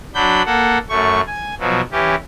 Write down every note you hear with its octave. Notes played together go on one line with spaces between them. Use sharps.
F#3 D4 B5 G6
A#3 A4 F#5
F#2 A3 C#6
G#5
B2 F3 F#3
E3 C#4 G4